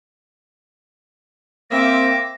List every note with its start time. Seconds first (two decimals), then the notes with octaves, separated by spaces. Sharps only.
1.71 A#3 C4 E5 D6 A#6